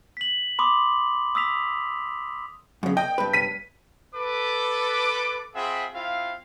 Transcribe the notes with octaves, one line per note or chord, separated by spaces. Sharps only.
B6 F#7
B5 C6 D6 D#6
D#6 E6 B6 F7
F#2 C#3
D#5 G5
G2 B4
B6 D#7
A4 B4 D6
C4 F4 G#4 E5 F#5 B5
C4 E4 F4 F5